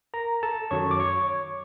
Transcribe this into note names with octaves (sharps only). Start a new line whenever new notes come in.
A#4 A#5
A4 A5
F#2 D#3 F#3 C#5 C#6
D6
C#5 C#6